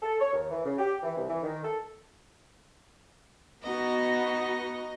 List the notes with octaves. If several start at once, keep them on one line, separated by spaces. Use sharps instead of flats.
A4
C#5
D#2
E3
C#3
G4
E3
C2
E3
D#3
A4
B3 D#4 F#4 D#5